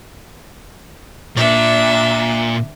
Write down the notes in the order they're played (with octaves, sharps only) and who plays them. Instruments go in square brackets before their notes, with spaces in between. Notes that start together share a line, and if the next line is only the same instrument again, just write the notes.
[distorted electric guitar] A#2 [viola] D4 E5